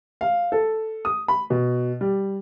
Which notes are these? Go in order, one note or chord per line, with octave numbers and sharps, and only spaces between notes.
F5
A4
D#6
B5
B2
G3